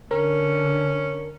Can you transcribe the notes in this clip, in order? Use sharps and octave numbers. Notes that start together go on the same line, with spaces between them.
D3 C#4 A#4